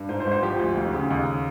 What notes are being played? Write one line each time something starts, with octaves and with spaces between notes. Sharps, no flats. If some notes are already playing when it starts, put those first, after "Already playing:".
Already playing: G2
G#2 C5
C5
G#1
C5
F3 G4
D2
D#2
C#3
D#2